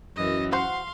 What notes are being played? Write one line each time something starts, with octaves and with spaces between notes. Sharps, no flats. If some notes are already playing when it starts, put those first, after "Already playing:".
F#2 E3 D#5
F#4 C5 F5 F#5 C6